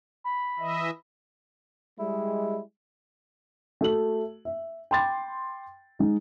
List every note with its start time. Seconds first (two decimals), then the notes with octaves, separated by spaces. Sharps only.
0.24 B5
0.59 E3 D#5 E5
1.99 G3 G#3 E4
3.81 A3 F#4 F#7
4.45 E5
4.91 G5 B5 C6 D6 A6
5.99 G#3 D#4